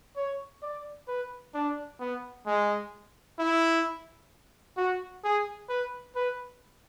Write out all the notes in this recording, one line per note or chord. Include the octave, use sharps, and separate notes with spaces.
C#5
D5
B4
D4
B3
G#3
E4
F#4
G#4
B4
B4